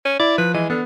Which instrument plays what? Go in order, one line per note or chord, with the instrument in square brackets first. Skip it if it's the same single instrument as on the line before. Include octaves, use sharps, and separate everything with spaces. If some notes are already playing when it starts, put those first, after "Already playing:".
[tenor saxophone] C#4
[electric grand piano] E4 [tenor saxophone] D5
[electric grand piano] F3 [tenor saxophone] B4
[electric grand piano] E3 [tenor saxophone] G#3
[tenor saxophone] D3 [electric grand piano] B3